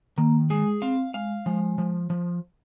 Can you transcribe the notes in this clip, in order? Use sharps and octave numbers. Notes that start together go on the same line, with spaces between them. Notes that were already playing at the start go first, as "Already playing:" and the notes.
D#3 A#3
G#3 G#4
C4 F5
G#3 F5
F3 G#3
F3
F3